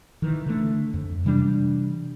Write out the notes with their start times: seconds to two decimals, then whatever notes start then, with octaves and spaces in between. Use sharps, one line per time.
0.22 D#3 E3
0.46 D3 A3
0.94 F2
1.25 C3 E3 G3 D4